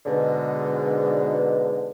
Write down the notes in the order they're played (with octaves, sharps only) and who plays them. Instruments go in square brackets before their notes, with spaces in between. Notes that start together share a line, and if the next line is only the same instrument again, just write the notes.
[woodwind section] G#2 B2 D3